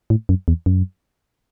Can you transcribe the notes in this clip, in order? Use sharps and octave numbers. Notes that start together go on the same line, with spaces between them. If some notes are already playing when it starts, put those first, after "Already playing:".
A2
F#2
E2
F#2